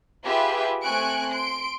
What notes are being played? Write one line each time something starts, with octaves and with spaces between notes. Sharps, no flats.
F4 G4 G#4 B4 E5 G5
A3 C4 G#5 C#6 F#6 D7
C6 D7